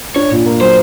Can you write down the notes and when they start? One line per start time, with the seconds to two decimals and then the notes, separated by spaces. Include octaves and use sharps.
0.16 D4 C#5
0.31 A#2
0.46 A#3
0.61 F#3 C5